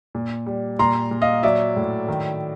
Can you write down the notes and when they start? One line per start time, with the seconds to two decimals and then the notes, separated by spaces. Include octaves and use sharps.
0.15 A#2
0.46 G3
0.79 A#2 A#5 C6
1.11 A#2
1.22 D#5 F5
1.43 F#3 D5 E5
1.76 A2
2.08 D#3